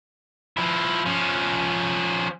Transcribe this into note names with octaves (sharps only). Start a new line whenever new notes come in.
F3 E4
F3 C#4